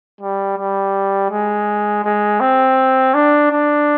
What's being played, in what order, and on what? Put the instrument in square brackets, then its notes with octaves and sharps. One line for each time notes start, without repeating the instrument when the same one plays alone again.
[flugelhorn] G3
G3
G#3
G#3
C4
D4
D4